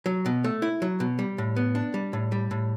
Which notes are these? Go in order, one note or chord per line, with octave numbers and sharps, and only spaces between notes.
F#3
B2
A3
E4
F#3
B2
G3
A2
B3
D4
G3
A2
G3
A2